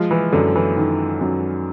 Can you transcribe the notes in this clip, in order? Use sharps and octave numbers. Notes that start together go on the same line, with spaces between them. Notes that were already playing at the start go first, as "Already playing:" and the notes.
Already playing: F3 G#3
E3
F#2 D3
E3
D#3
F#2